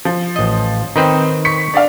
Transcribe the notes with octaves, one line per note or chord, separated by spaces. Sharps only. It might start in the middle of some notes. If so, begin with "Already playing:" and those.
F3
A1 D#5
D#3 C4 D#4 B4 C5
C#6 B6 C#7
D4 D5 F5